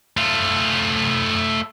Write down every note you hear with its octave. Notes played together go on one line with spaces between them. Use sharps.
A3 F4